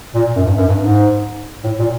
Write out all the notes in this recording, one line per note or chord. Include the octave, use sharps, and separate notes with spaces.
A#2
F#2
G2
F#2
G2
G#2
A2
A#2